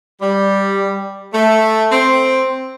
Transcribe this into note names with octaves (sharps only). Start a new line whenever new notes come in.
G3
A3
C4